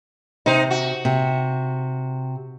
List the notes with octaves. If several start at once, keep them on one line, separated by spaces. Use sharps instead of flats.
C3 D#4 C5
F#4
C3